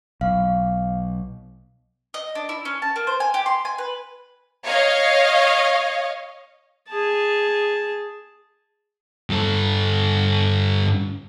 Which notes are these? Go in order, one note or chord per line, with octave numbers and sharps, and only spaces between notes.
B1 F5
D#5
D4
E4
C#4
A5
A#3
C5
G#5
G4
C6
G#5
B4
C#5 D#5 F5
G#4 A5
G2 A4